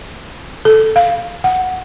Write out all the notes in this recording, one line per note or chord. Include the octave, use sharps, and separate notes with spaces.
A4
F5
F#5